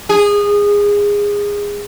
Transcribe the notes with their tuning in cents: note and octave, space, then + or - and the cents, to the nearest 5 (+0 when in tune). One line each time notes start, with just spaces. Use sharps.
G#4 -20